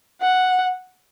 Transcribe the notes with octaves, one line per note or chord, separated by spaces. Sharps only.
F#5